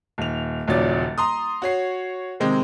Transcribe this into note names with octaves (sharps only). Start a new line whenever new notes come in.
D#1 F7
D#1 A#1 C#3 F#3 D5 A6
A#5 C6 D#6
F#4 C#5 C7
C3 D#3 G#3 C4